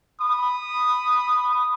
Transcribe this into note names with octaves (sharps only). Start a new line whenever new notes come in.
B5 D#6